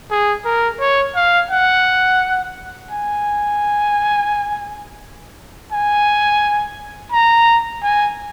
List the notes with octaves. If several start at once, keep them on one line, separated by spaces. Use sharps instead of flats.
G#4
A#4
C#5
F5
F#5
G#5
G#5
A#5
G#5